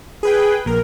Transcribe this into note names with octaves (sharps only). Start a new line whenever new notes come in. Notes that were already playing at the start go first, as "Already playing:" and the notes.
G#4 B4 G5
A#1 A#4